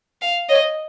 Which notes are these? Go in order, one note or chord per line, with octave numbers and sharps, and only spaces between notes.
F5
C#5 D#5